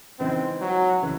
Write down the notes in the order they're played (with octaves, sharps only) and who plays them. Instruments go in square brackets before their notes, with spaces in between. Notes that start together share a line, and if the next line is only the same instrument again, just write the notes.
[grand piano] C#3 E3 G#3 D#4 [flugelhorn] C4
[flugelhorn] F#3
[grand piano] C#3 E3